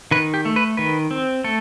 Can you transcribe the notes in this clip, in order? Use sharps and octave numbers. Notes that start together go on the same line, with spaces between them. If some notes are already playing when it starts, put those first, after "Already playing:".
D#3 B4
G4
A3
B4
D#3 B4
C4
A3 A4